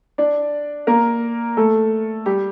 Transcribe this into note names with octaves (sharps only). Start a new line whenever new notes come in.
D4 D5
A#3 A#4
A3 A4
G3 G4